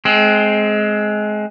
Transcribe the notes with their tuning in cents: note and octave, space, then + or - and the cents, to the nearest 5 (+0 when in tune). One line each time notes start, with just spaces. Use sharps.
G#3 +20 C4 +0